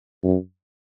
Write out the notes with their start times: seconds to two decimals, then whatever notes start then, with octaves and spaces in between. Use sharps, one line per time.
0.24 F#2